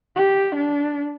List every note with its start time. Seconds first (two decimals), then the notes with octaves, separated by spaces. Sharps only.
0.16 G4
0.56 D4